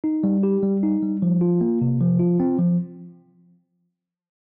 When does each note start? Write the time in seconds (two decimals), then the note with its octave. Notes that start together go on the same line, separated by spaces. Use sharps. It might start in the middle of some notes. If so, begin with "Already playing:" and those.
0.04 D#4
0.24 G3
0.43 G4
0.63 G3
0.83 D#4
1.03 G3
1.22 F3
1.41 F4
1.61 A#3
1.81 C3
2.01 F3
2.19 F4
2.40 C4
2.59 F3